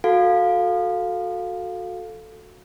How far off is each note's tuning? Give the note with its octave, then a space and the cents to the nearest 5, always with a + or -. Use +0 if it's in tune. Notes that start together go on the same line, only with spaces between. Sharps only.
F#4 -15 A4 +0 F5 +10